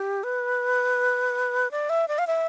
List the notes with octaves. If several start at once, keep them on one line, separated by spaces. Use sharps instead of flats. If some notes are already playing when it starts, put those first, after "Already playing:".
Already playing: G4
B4
D5
E5
D5
F5
E5